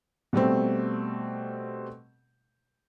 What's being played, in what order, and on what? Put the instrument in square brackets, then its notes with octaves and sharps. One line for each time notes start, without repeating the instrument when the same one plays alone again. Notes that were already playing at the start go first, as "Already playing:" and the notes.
[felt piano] B2 G3 A3 C4